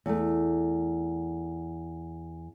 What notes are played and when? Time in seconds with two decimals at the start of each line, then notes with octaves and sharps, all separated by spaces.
0.06 E2 A3